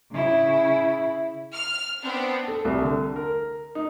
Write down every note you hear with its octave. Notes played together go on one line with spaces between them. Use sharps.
C#3 E4
F6
B3 C4 D4
A4
C2
D3
A#4
D#4